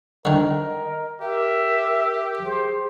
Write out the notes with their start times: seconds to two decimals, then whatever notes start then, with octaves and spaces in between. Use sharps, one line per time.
0.25 D3 D#3 A#4 D#5
1.21 G4 A#4 E5
2.45 G#4 C5